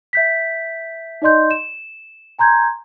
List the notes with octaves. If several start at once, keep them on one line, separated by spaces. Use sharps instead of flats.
E5 G6 B6
D#4 D5 D#5 C6 G6
E7
G#5 A#5 C6 G6 G#6